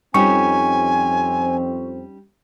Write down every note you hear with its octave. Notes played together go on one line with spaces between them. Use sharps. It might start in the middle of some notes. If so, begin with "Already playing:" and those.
F2 G3 C4 C#4 D#4 G#5 C#6